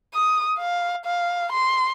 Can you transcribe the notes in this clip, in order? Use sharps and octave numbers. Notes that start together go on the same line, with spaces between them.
D#6
F5
F5
C6